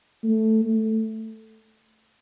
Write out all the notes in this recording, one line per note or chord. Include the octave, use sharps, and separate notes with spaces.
A3
A3